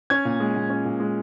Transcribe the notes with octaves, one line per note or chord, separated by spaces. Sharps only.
C#4 G#6
A#2
G#3
A#2
C#4
A#2
G#3